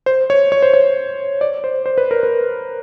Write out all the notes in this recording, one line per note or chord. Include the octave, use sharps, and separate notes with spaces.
C5
C#5
C#5
C5
C#5
D5
C5
C5
B4
A#4
B4